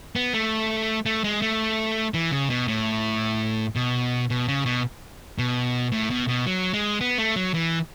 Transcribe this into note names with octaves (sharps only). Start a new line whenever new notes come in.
B3
A3
A3
G#3
A3
E3
C#3
B2
A2
B2
B2
C#3
B2
B2
A2
B2
B2
F#3
G#3
B3
A3
F#3
E3